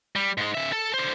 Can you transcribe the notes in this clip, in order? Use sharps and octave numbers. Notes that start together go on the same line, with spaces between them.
G3
G#2 G#3
C#3 E5
A4 A5
D3 C5